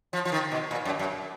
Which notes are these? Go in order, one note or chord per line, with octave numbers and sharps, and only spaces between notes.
F3
F3
D#3
B2
A#2
F#2
F#2